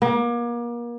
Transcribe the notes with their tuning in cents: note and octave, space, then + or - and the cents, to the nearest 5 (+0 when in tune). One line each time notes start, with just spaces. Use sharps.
A#3 +35